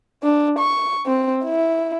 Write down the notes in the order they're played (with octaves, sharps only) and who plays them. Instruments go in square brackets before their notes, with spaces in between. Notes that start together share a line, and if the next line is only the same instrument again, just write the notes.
[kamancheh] D4
C#6
C4
E4